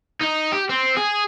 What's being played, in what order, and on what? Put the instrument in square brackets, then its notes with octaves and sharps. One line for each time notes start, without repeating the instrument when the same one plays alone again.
[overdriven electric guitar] D#4
G4
C4
G#4